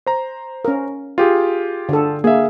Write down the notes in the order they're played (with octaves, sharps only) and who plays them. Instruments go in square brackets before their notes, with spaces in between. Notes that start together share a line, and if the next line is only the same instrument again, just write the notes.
[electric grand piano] C5 A#5
[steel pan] C#4 A#4
[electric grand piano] F4 G4 G#4
[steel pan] D3 A4
[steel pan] A#3 [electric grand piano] G#4 E5